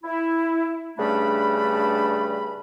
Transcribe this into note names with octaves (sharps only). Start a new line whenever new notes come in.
E4
G2 C#3 G3 A3 D4 B5